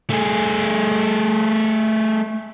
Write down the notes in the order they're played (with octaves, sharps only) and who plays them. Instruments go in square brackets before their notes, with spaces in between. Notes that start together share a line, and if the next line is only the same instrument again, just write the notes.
[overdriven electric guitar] A3 G#4